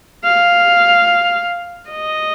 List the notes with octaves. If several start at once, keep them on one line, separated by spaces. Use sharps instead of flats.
F5
D#5